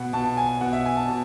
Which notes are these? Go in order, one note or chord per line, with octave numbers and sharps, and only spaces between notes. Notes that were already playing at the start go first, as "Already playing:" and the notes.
Already playing: B2 F#5
B2 A5
G#5
B2 F#5
E5
G#5
A5
B2